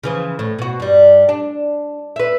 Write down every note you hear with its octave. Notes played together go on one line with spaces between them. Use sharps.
C#3 E3 F3
A2
B2 F#4
G2 G3
D4
B4 E5